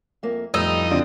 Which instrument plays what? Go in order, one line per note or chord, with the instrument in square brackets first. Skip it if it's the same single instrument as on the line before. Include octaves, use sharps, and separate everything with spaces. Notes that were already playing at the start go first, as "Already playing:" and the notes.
[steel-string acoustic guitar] F2 A#3 E5
[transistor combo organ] F2 D#5 [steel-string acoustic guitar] A2 G3 B4 [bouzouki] D#4 [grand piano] D#6 E6
[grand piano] D3 C4 D4 [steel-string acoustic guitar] F4